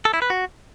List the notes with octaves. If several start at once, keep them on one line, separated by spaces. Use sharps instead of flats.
A4
E4
B4
F#4